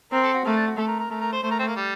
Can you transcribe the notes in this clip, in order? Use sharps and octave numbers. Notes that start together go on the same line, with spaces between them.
C4 A#4
A4
F#4
A3 A#3
D4
F#4
A3 A4
A#4
A#4
A3 A#4
A#4
C5
A3 C5
A#4
C4
A#3
G3